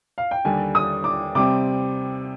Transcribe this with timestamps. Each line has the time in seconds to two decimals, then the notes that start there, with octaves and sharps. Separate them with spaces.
0.18 F5
0.31 G5
0.45 D#2 D3 G3 D4 G#5
0.75 D#6
1.04 D6
1.35 C3 G3 C4 D6